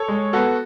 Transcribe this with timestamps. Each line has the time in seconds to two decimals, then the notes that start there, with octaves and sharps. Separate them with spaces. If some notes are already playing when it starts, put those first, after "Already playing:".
Already playing: A4 C#5
0.08 G#3
0.33 B3 F#4 A4